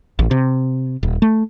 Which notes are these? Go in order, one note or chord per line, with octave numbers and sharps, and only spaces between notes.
A1
C3
D#1
A3